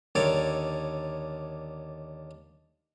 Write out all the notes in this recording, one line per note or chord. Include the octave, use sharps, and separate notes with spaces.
D#2 D3 A4 A#4 C#5 D6